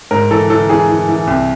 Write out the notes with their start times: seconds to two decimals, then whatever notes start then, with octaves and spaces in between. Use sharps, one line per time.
0.11 G#2 A#4
0.31 E3 A4
0.50 E3 A4
0.69 E3 G#4
0.89 E3
1.09 E3
1.27 C2